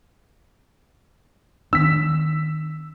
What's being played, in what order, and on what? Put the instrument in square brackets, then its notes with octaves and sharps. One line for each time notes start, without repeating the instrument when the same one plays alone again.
[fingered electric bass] D#3 B3 D4 [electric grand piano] E6 B6